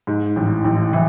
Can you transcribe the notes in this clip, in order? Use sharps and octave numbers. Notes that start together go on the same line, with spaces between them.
G#2
A1
A1
E3